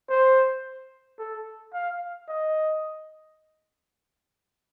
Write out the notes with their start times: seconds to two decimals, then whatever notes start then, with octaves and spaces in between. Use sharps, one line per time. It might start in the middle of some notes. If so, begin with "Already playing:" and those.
0.10 C5
1.19 A4
1.74 F5
2.28 D#5